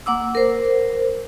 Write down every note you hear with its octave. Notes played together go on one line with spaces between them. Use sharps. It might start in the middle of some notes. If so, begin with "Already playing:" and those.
A#3 F#5 D6 E6
A#4 C5